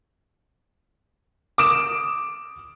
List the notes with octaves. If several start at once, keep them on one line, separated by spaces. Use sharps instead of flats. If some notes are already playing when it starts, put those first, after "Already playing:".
D6 D#6 D7 E7